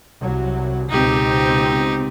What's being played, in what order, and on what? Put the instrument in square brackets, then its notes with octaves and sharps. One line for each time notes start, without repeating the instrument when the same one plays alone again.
[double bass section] C2 F#3
[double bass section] C#2 B2 C4 [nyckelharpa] D#4 G4